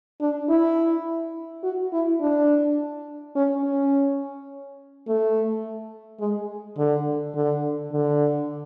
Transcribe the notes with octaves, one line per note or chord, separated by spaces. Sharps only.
D4
E4
F#4
E4
D4
C#4
C#4
A3
G#3
D3
D3
D3